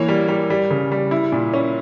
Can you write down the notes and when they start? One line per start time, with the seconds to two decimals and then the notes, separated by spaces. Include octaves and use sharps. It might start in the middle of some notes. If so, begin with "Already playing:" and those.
Already playing: E3 A#3 C#5
0.08 G3
0.28 G3
0.50 G3
0.71 C#3
0.92 G3
1.11 E4
1.32 A#2
1.53 C#4